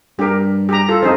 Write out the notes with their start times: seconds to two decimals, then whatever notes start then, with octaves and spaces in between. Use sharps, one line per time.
0.19 G2 G4 A#4
0.69 G4 A#5
0.89 F4 A4
1.03 F2 D#4 G#4 C5